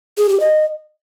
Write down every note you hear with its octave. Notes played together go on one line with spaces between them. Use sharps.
G#4
G4
D#5